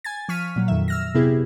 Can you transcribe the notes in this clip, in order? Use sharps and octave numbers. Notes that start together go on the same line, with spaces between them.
G#5 G#6 A6
F3 C#6 F6 B6 D#7
A#2 F#3
F2 D#3 E5
E6 F6 A#6
C3 B3 E4 G4 G#4